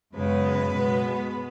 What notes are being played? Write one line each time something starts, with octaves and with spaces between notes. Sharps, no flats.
F#2 C#3 G#3 B3 B4
B2 G#3 B3